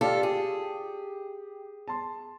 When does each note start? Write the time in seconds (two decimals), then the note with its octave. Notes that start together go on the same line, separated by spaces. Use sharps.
0.01 F4 G4 A4 D5 F5
0.23 G4 G#4
1.88 A5 C6